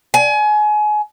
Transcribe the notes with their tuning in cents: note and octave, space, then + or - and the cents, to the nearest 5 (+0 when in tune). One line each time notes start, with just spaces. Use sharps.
G#5 +30